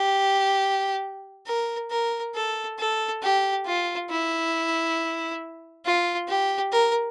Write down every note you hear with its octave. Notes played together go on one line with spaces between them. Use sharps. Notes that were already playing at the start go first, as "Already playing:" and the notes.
Already playing: G4
A#4
A#4
A4
A4
G4
F4
E4
F4
G4
A#4